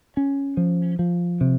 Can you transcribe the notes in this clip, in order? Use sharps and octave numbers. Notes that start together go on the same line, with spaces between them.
C#4
F3
F3
C3